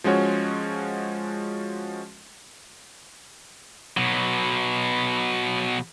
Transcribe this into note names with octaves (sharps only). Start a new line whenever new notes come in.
F3 G#3 C#4 F#4 C#5
B2 F#3